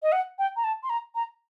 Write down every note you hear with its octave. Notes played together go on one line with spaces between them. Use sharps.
D#5
F#5
G5
A#5
A5
C6
A#5
A#5